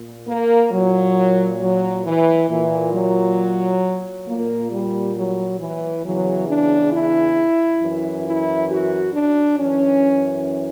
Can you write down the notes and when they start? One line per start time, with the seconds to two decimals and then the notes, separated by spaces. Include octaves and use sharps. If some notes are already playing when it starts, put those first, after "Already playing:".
Already playing: A#2
0.27 A#3
0.72 A#2 F#3
1.60 F#3
2.04 E3
2.49 A#2 E3
2.93 F#3
4.26 A#2 A#3
4.71 G3
5.16 F#3
5.59 E3
6.04 E2 C#3 E3 F#3
6.48 D4
6.92 E4
7.81 F#2 E3
8.25 E4
8.70 F#4
9.14 D4
9.58 F#2 E3 C#4